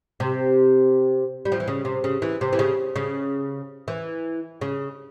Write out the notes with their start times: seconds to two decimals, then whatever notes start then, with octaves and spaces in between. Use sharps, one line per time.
0.20 C3
1.45 G3
1.52 F3
1.60 E3
1.68 C#3
1.85 C3
2.04 C#3
2.22 E3
2.41 C3
2.53 E3
2.59 C#3
2.96 C#3
3.88 E3
4.61 C#3